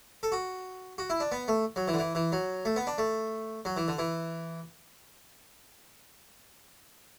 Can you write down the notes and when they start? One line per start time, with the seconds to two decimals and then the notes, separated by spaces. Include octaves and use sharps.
0.23 A4
0.32 F#4
0.98 F#4
1.10 E4
1.20 D4
1.32 B3
1.48 A3
1.76 F#3
1.88 E3
1.94 D3
1.99 E3
2.15 E3
2.32 F#3
2.65 A3
2.76 B3
2.87 D4
2.98 A3
3.65 F#3
3.77 E3
3.88 D3
3.99 E3